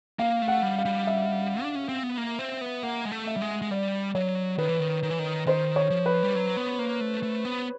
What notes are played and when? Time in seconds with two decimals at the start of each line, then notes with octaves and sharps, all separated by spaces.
0.19 A#3 F5
0.42 A3
0.48 F#5
0.63 G3
0.78 F5
0.85 G3
1.07 E5
1.62 D4
1.75 C#4
1.89 C4
2.03 B3
2.18 A#3
2.39 C4
2.61 B3
2.83 A#3 F#5
3.05 G#3
3.12 A3
3.27 E5
3.37 G3
3.42 G#3
3.62 G#3
3.71 G3 D5
4.15 F#3 C#5
4.58 D#3 B4
4.69 E3
4.80 D#3
5.03 D#3
5.10 E3
5.19 D#3
5.46 D#3 C5
5.76 C#5
5.90 F3
6.06 B4
6.23 G3
6.35 F#3
6.57 B3
6.79 A#3
7.00 A3
7.23 A3
7.45 B3